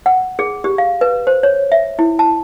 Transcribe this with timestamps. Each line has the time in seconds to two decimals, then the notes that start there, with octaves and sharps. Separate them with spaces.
0.06 F#5
0.39 G#4
0.64 G4
0.78 F5
1.01 B4
1.27 C5
1.43 C#5
1.72 E5
1.99 E4
2.19 A5